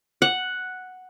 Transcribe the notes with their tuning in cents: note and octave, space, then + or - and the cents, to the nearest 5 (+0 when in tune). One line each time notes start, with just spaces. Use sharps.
F#5 +0